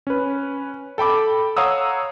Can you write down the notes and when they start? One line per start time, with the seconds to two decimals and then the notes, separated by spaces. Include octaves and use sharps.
0.07 C#4 B4
0.98 A4 G5 B5 D6
1.57 C#5 F5 F#5 A#5 D#6 E6